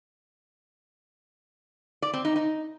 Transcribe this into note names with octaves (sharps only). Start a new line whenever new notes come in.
D5
C4
D#4
D#4